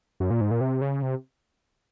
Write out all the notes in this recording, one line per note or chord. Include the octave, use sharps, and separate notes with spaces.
F#2
A#2
G#2
A#2
C3
C#3
C3